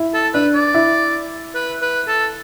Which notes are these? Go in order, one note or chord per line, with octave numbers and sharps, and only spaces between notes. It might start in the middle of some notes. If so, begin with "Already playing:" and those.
Already playing: E4
A4
D4 B4
D5
E4
B4
B4
A4